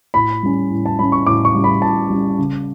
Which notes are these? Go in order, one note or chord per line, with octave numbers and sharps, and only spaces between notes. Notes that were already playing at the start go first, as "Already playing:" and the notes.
A2 B5
G3 C#4
A2
A5
G3 C#4 B5
C#6
A2 D6
C#6
G3 C#4
B5
A2 A5
G3 C#4
C#3